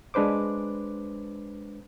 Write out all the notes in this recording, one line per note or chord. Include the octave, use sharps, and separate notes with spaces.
G#3 D4 B4 C5 D6